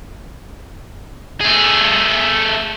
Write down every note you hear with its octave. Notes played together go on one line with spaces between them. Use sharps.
A3 G#4